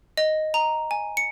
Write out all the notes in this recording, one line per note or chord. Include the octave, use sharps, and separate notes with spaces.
D#5
A#5
G#5
C#7